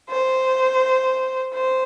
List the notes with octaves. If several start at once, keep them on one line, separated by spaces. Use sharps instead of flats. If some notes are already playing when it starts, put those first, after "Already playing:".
C5
C5